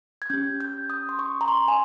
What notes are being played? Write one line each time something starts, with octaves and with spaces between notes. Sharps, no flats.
G#6
C#4 G4 G6
G6
D#6
C6
C#6
A#5
C6
G#5